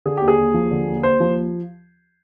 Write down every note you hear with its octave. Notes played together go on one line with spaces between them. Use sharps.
D3 G#4
D#2 G4
G#4
D#2
F3
D3
D#2
D#2 C5
F3